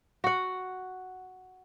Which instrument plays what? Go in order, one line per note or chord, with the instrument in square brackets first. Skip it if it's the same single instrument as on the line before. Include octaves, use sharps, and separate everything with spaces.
[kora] F#4 F#5